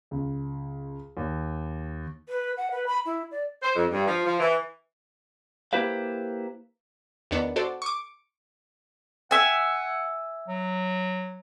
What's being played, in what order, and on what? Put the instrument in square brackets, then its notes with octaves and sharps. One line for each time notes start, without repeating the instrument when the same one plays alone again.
[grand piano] C#2
D#2
[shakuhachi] B4
F#5
B4
B5
E4
D5
[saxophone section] C5
F2
G2
F3
F3
E3
[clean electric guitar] A#3 E4 G4 B4 C5 F5
[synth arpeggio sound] E2 D#3 B3 D4
F#4 A4 C5 D5
C#6 D6
[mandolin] E5 G#5 [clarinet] F#5
[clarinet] F#3